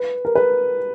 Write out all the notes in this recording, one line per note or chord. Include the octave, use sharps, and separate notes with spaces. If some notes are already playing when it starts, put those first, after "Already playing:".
Already playing: B4
A#4
B4